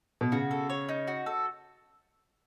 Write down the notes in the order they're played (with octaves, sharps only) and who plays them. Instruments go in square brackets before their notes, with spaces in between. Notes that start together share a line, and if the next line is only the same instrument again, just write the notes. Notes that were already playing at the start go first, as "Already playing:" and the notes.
[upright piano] B2
[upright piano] C#3 [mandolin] F#4
[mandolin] A4
C#5
D#4
F#4
A4